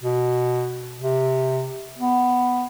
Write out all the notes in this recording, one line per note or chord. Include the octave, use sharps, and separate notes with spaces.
B2
C3
B3